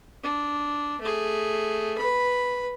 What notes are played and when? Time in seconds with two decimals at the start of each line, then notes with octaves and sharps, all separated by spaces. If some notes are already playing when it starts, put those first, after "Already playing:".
0.23 D4
1.01 A3 G#4
1.98 B4 B5